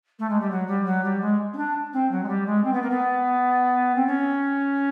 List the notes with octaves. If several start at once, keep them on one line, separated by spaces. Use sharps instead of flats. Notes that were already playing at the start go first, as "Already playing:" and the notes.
A3
G#3
G3
F#3
G3
F#3
G3
G#3
C#4
D4
C4
F#3
G#3
G3
G#3
C4
B3
A#3
B3
C4
C#4